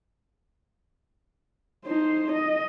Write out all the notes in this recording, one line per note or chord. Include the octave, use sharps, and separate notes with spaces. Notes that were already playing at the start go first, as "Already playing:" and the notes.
D#4 C5
D#5